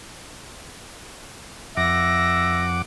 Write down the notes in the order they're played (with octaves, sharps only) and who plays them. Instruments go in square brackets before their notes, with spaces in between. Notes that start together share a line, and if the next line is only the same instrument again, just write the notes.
[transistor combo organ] F2 F#5 D6 [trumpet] E5 [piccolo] A#6